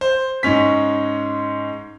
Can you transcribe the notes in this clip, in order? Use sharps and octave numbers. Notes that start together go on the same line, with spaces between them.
C5
G#2 G#3 C#4 B6